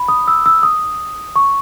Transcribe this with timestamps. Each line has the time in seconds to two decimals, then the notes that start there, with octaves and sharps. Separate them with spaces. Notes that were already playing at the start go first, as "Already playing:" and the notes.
Already playing: B5
0.08 D#6
0.28 E6
0.46 E6
0.63 D#6
1.36 C#6